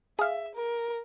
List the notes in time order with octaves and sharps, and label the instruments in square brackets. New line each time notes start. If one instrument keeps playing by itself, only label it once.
[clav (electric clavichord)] G#4 F5 [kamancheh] E5
[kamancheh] A#4